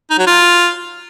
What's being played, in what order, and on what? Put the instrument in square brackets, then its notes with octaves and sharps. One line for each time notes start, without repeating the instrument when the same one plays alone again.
[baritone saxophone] D#4
F#3
F4